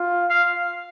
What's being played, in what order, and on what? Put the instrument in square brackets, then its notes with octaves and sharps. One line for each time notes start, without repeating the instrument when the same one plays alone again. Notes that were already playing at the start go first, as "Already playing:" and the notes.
Already playing: [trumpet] F4
[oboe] F5